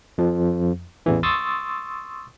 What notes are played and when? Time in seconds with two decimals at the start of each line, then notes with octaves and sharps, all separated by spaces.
0.18 F2 F3
1.06 A1 E2 E3
1.23 C6 C#6 D#6 E6 A6